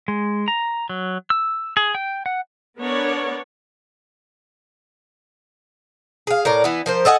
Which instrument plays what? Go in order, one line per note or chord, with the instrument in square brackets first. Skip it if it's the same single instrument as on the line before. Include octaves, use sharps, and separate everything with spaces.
[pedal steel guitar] G#3
A#5
F#3
E6
G#4
G5
F#5
[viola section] B3 D4 A#4 C#5 D5
[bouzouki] G#4 F5
A2 A#4 D5
E3 B3
F3 A#4 C5
A4 D#5 F#5 G#5